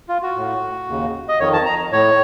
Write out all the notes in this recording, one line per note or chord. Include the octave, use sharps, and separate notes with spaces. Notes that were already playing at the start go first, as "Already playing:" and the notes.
F4
F#4
A2
D#2 C#3
D#5
F2 D#3 C#5
A5
A#5
A2 C#5